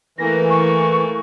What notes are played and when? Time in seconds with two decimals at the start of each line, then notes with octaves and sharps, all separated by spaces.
0.18 E3 A3 A#3 A#6
0.50 C#6